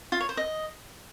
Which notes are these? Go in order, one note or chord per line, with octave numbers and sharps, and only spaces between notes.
F4
C#5
C5
D#5